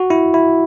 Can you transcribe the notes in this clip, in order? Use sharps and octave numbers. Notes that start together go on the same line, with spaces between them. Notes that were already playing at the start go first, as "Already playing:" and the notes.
Already playing: F#4
E4
E4